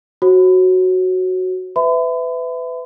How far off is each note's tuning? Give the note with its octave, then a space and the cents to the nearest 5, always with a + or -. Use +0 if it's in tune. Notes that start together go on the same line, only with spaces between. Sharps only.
F#4 +0 C#5 -45
B4 +30 E5 +0 B5 +40